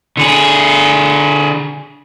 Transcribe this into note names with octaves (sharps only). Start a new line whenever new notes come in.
D3 G#4